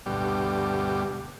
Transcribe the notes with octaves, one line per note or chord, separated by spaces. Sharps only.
D2 G2 B2 G3 G4